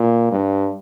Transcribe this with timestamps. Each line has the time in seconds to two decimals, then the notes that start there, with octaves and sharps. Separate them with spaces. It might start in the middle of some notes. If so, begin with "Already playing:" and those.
Already playing: A#2
0.31 G2